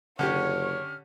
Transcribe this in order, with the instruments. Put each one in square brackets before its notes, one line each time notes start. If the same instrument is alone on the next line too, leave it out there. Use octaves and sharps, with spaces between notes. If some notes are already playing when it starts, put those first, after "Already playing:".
[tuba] F#1 [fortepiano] D3 C#4 G4 [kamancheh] C#5 [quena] F6